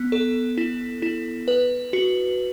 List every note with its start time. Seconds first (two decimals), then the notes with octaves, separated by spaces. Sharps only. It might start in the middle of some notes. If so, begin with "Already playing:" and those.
Already playing: B3
0.12 A4
0.58 E4
1.02 E4
1.48 B4
1.93 F#4